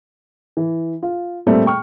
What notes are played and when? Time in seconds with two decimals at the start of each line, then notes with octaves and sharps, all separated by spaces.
0.57 E3
1.03 F4
1.46 A#2 G3 A3 C4
1.66 G5 C#6 F6